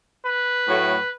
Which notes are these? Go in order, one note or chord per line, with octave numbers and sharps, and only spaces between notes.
B4
A2 F#3 A3